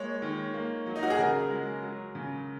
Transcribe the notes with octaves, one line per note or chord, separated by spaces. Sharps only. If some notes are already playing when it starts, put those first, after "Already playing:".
Already playing: G#3 A#3 C#5
D#3
A#3
F#3
D#4
F#4
G#4
C#3 A#4
G#3
F#3
C#3